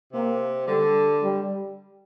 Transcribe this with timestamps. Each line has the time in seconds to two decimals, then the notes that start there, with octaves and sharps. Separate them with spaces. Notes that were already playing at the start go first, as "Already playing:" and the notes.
0.13 C3 A#3
0.67 D3 G3
1.23 G3